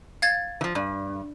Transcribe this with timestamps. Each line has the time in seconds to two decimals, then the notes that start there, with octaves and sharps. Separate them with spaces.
0.22 F5 G#6 A6
0.61 E3 F3
0.75 G2